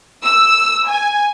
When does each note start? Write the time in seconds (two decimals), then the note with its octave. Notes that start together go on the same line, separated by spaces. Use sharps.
0.23 E6
0.88 G#5